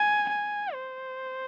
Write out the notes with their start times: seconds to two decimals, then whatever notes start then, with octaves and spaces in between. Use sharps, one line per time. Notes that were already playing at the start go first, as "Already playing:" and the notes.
Already playing: G#5
0.29 G#5
0.74 C5